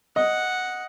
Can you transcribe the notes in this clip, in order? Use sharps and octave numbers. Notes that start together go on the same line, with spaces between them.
D#5 F#5